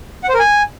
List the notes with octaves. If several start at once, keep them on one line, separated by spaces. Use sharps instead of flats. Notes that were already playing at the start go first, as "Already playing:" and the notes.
F#5
C5
A#4
G#5